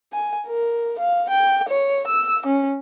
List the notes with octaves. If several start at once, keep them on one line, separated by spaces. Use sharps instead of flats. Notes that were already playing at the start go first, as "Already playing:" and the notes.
G#5
A#4
F5
G5
C#5
E6
C#4